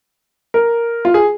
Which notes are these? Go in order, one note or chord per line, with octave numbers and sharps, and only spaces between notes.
A#4
F4
G#4